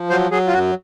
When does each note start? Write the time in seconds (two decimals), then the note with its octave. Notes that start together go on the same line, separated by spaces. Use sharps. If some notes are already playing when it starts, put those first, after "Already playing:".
Already playing: F3
0.10 F#3 C5
0.31 F#3 G#4
0.47 F4
0.53 F#2 F#4